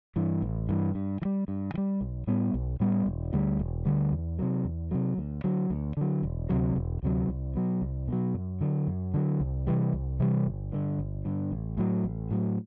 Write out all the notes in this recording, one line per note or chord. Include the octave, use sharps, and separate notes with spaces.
G2 E3
A1
G2 E3
G2
E3
G3
G2
E3
G3
B1
A2 G3 B3
B1
A2 G3 B3
E1
D2 D3 G3
E1
D2 D3 G3
E2
C3 F#3
E2
C3 F#3
D2
D3 F#3
D2
D3 F#3
E1
D2 C3 F#3
E1
D2 C3 F#3
C2
B2 F#3
C2
B2 F#3
F#2
D3 F#3
F#2
D3 F#3
C2
C3 E3 G3
C2
C3 E3 G3
G1
G2 D3
G1
G2 D3
A1
A2 F#3
A1
A2 F#3